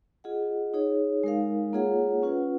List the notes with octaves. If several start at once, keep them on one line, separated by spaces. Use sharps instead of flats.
F4 G#4 D#5 F#5
D#4 G#4 C#5
G#3 D#4 A#4 F5
A#3 F4 G#4 C#5 F#5
C#4 F4 B4 F#5